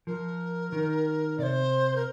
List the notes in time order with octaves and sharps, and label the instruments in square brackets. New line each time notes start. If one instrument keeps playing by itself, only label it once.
[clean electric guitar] F3 [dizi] A#4
[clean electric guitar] D#3
[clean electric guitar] C3 [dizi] C5 D5
[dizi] A#4